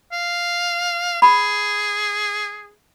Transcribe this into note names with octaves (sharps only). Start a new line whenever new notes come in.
F5
G#4 B5